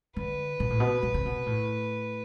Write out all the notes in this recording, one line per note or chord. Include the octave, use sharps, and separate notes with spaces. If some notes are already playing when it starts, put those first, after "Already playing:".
D3 B4
B2
A2
B2
B2
C3
B2
A2